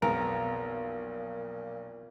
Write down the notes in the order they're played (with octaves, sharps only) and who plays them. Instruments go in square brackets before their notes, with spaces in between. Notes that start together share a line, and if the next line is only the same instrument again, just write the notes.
[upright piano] B1 F2 G#4 [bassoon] A#2 [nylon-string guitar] B3 [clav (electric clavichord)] A#4